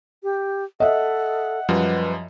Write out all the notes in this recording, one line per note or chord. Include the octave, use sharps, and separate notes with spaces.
G4
A4 D#5 E5 F#5
F#2 F3 G3 B4